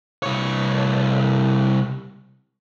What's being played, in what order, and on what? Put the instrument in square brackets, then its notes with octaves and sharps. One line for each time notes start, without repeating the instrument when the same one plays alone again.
[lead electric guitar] C2 C#5